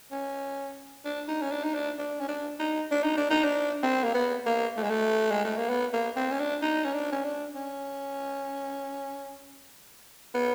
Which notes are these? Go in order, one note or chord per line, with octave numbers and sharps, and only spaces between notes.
C#4
D4
D#4
C#4
D4
D#4
D4
D4
C#4
D4
D#4
D4
D#4
D4
D#4
D4
C4
A#3
B3
A#3
A3
G#3
A3
G#3
A3
A#3
B3
A#3
C4
C#4
D4
D#4
C#4
D4
C#4
D4
C#4
B3